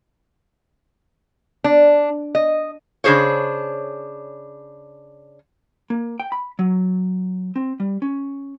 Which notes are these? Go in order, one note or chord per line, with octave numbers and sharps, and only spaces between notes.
D4
D#5
C#3 D4 G#4 C5 C#5
A#3
G5
B5
F#3
C4
G3
C#4